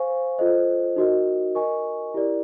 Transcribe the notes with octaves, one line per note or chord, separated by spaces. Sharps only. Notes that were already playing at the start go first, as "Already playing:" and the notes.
Already playing: C5 F5 G#5 C#6
F4 A4 C5 D#5
D#4 F#4 A#4 D#5
A#4 D#5 G#5 C#6
E4 G4 A#4 D5